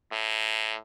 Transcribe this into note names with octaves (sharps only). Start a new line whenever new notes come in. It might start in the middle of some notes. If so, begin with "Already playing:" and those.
A2